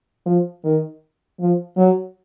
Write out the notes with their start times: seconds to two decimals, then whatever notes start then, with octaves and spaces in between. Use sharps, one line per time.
0.26 F3
0.64 D#3
1.40 F3
1.77 F#3